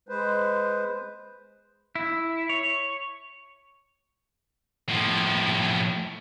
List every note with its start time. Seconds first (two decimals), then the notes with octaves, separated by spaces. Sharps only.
0.09 G#3 B4 C5
1.95 E4
2.49 C#5
4.89 A2 F3